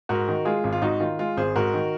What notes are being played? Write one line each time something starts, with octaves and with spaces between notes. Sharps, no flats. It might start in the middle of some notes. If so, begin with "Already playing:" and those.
G#2 F#4 A#4
D#3
G#3 F4 G#4
G#1
F4
G#2 D#4 F#4
D#3 F4
G#3 F4
G#1 G#4 C5
G#2 F#4 A#4
D#3